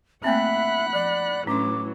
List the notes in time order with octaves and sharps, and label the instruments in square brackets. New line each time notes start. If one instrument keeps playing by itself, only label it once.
[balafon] A3 A#3 C4 [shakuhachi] E5 [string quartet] F#5 B5 F#6
[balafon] F3 [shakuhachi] D5
[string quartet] A2 E3 F#3 [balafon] C#4 D4 [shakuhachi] D6